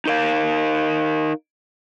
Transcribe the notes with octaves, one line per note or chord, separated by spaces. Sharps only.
D#4 A#4 F5